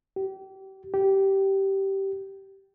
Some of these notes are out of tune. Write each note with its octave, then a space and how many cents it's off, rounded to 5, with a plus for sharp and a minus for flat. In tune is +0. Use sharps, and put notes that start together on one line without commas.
G4 -35
G4 -15